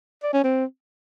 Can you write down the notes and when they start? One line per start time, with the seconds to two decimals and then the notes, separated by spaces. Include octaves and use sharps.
0.23 D5
0.33 C#4
0.44 C4